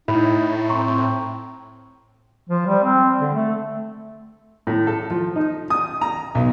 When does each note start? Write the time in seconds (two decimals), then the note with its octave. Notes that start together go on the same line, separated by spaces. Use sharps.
0.08 A2 D#4 E4 B5
0.69 C4 A#5 C6 C#6
2.50 F3
2.67 G3
2.84 C4
3.20 D3
3.34 A3
4.67 A2
4.87 A4
5.10 F3
5.36 D#4
5.70 D#6
6.01 A#5
6.35 B1